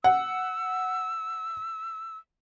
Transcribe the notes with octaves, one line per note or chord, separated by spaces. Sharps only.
F#5 E6